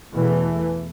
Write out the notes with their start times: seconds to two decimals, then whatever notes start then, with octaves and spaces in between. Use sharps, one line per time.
0.14 E2 B2 E3 A3